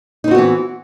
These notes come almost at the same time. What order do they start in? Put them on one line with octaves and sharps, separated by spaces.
D#4 C4 F#4 B3 E3